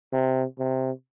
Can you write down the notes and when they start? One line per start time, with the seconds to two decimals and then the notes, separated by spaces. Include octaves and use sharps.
0.13 C3
0.59 C3